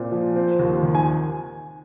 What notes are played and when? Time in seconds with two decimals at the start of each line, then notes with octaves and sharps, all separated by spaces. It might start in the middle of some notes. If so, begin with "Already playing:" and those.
Already playing: A#2 C4
0.12 F3
0.35 C4
0.59 D#2
0.83 D#3
0.95 G#5